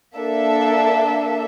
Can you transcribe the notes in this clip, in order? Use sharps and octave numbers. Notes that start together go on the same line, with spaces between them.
A#3 D4 A4 E5